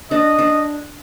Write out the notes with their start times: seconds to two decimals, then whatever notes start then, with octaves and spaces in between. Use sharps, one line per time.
0.11 D4 D#5
0.39 D4